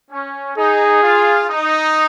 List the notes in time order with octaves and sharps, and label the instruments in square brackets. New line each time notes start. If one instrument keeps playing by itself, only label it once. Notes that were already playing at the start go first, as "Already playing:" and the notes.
[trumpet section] C#4
[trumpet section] D#4 [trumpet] G#4
[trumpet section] F4
D#4